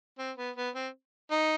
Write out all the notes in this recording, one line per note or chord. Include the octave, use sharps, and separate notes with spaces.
C4
B3
B3
C4
D#4